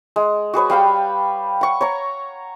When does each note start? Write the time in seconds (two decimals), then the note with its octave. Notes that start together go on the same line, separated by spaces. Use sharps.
0.16 G#3
0.54 F#4 G#4 B4 C#5
0.70 G3 F5 G5 B5
1.61 F#5 C#6
1.81 C#5 A#5 C#6